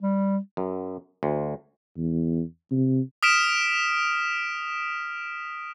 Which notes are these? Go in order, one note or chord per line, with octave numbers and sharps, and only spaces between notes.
G3
F#2
D2
E2
C3
D#6 F6 B6 D7 E7